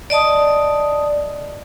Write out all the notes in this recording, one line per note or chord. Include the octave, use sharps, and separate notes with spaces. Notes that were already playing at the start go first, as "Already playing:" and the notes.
D5 D#5 A5 D#6